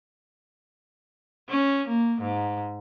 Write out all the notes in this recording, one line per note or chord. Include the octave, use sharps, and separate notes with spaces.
C#4
A#3
G#2